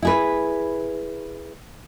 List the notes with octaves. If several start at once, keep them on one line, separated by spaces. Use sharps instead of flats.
E4 G#4 B4